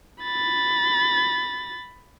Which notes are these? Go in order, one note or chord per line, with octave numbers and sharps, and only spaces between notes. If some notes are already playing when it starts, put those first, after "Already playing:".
B5 A6